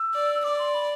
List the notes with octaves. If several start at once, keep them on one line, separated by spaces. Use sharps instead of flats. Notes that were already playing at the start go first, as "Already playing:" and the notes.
Already playing: E6
D5
E6
D5 D6
C6
B5